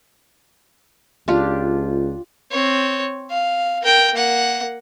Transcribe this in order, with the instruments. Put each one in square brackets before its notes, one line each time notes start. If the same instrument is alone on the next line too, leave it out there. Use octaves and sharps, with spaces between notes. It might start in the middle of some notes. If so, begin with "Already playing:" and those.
[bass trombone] C#2 [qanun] D4 F4 G4
[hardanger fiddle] C4 C#5
F5
A#4 G5
A#3 F#5